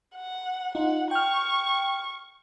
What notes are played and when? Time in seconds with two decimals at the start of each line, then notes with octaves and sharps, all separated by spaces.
0.15 F#5
0.75 D#4 F4 F#5
1.11 G5 C#6 F6